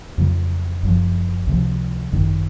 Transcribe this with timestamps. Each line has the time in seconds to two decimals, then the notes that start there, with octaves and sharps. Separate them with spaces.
0.18 F2 C#3 F#3
0.83 F#1 F#2 F3
1.47 C#2 C3 F3
2.12 G#1 F#2 D#3